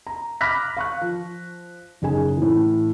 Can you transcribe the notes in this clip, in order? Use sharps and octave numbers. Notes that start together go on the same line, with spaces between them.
A#5
B5 D6 F6 F#6 A#6 B6
F5 C#6 F#6
F3
F#1 D#4 G#4 G#5
A2 E3